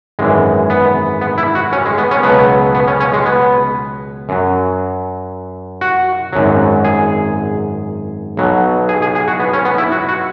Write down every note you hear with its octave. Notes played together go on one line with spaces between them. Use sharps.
G#1 F#2 E3 G#3
B3
B3
E4
F#4
C#4
G#3
B3
C#4
C#2 B2 F#3 B3
B3
C#4
C#4
G#3
B3
F#2 F#3
F#4
G#1 F#2 F#3
G#4
B1 B2 F#3
G#4
G#4
G#4
F#4
B3
C#4
B3
E4
F#4
F#4